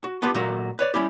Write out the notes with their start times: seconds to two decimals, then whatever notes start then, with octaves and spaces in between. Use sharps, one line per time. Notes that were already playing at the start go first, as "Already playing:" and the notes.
0.04 F#4
0.22 B3 D4 F4 G4 B4
0.34 A#2 F#3 A3 A#3 F#4 A#4
0.79 B4 C#5 D5
0.94 G3 C#4 E4 G4